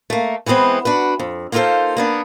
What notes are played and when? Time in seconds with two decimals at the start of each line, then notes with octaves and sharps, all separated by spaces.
0.10 A3 A#3
0.46 E3 G3 G#3 B3 C4
0.85 D4 F#4 B4
1.19 F2
1.52 A#3 D#4 F4 G4 A4 C5
1.97 A#3 B3 D4